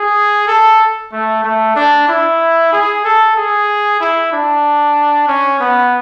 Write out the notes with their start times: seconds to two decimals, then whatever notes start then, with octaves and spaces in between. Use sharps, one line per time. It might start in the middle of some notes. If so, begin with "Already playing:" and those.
Already playing: G#4
0.48 A4
1.12 A3
1.44 A3
1.76 D4
2.08 E4
2.73 G#4
3.04 A4
3.37 G#4
4.00 E4
4.32 D4
5.28 C#4
5.60 B3